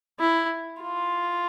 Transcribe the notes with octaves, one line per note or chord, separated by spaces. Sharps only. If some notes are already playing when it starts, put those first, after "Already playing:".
E4
F4